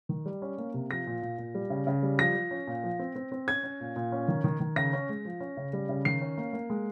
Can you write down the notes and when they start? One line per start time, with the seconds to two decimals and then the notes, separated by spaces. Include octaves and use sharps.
0.09 D#3
0.26 G3
0.42 C#4
0.58 A#3
0.74 C3
0.90 F3 A#6
1.07 A#2
1.22 A#2
1.38 A#2
1.55 G3
1.70 C#3
1.87 C#3
2.03 G3
2.19 F3 A#6
2.35 F3
2.51 C#4
2.67 A#2
2.83 F3
2.99 C4
3.16 C4
3.32 C4
3.48 C#4 G#6
3.64 C#4
3.80 A#2
3.96 A#2
4.12 C#4
4.28 D#3
4.44 D#3
4.60 D#3
4.76 C#3 A#6
4.93 C#4
5.09 G#3
5.25 F3
5.40 C#4
5.57 C#3
5.73 G3
5.89 C#3
6.05 D#3 C7
6.21 C#4
6.37 A#3
6.53 A#3
6.70 G#3